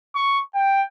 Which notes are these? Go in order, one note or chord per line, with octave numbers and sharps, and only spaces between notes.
C#6
G5